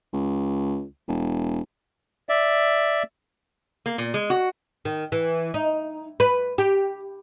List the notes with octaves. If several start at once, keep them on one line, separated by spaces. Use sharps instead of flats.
C#2
E1
D5 E5
A#3
A#2
G#3
F#4
D#3
E3
D#4
B4
G4